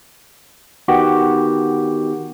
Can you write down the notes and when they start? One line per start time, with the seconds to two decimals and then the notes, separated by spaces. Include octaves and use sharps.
0.88 D#3 B3 F#4 G4